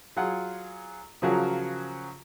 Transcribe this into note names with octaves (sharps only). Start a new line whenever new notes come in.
F#3 F4 G#4 F#5
C#3 F3 F#3 F#4 G#4 A#4